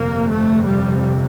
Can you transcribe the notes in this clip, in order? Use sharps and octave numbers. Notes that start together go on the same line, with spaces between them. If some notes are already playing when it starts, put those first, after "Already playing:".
Already playing: G1 F2 C3 A#3
A3
G3